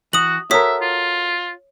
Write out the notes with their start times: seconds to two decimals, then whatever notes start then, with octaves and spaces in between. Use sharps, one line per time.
0.13 E3 F#4 D#6 F#7
0.51 F#4 A4 A#4 C#5 E5 D#6 B6
0.81 F4